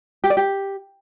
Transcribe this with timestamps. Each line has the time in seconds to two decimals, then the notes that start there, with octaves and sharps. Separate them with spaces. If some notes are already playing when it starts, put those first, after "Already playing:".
0.24 G4
0.30 D5
0.37 G4